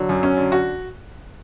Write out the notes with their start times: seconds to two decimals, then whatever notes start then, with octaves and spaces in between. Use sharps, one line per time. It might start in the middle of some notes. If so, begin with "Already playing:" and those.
Already playing: D3 F#3
0.09 F#2
0.23 C#4
0.37 D3
0.52 F#4